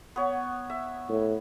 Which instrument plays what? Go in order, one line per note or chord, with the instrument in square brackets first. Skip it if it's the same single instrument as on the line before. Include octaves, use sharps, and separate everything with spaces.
[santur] B3 C#5
E5
[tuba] A2